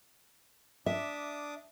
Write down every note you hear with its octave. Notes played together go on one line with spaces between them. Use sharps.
D4 E5 D6 D#6